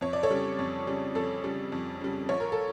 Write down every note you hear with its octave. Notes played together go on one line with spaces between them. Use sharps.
F2 C#5
D5
A4 C#5
C#3 G3
F2
C#3 G3
F2 A4
C#3 G3
F2
C#3 G3
A#1 C#5
A#4
A4